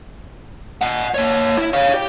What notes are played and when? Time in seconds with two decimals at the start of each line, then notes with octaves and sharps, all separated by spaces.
0.81 D#5 F#5
1.14 A#3 C#5
1.58 E4
1.73 C#5 F5
1.94 G4